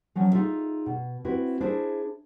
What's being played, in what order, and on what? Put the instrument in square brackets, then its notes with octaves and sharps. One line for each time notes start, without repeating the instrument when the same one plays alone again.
[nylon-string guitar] F3 F#3 C#4
D#4 F4 G#4 A4 E5
B2
C4 E4 F#4 B4
D4 E4 G#4 C5 E5